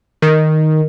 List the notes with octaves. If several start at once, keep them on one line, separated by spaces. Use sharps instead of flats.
D#3